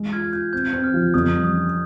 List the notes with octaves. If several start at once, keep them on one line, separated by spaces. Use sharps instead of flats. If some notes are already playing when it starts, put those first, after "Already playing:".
Already playing: G#3
F4 F6 G#6
F4 G6
C4 G6
C4
F6
F3
F2 D#6
G3
D#6
C#4